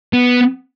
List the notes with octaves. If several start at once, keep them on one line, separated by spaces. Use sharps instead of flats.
B3